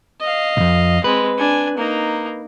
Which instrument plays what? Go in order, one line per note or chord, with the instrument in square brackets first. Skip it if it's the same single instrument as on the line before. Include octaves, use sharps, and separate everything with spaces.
[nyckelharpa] D#5 F5
[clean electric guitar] C2 F2
[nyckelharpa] G#3 C4 [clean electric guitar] B4
[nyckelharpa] D4 G#5
A#3 D#4